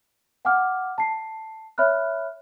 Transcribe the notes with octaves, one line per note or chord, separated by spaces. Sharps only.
F5 F#5 G#5 D6 F6
A5 C7
C#5 E5 B5 F6 F#6